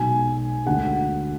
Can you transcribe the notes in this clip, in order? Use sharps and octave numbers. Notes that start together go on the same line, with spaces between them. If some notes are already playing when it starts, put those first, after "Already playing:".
Already playing: B1 B2 G#3 G#5
D2 D3 G#3 F#5